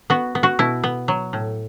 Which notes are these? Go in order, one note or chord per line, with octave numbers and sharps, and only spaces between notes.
B3 F#4
B3
F#4
B2 E4
B3
F#3
A2